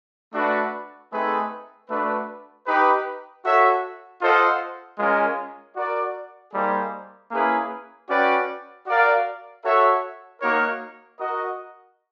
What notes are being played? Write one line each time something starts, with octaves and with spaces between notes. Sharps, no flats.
A3 D4 F#4 B4 D5
A3 C4 D#4 G#4 B4
A3 D4 F#4 B4
D#4 G4 B4
F#4 A4 C#5 E5
F4 A4 C5 D#5 F#5
G#3 C#4 F4 A#4
F#4 A#4 D5
G3 A#3 D#4 G#4 C5
A#3 C#4 E4 G#4 B4
C#4 F#4 B4 D5 G5
F#4 A#4 D5 F5
F#4 A4 C#5 E5
A#3 D#4 F#4 A#4 C#5
F#4 A#4 D#5